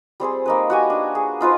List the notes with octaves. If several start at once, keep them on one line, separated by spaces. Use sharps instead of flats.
G3 C4 G#4 C5
A#3 D#4 B4
F#4 G4 G#5
D4
G#4
D#4 F4 B4 C5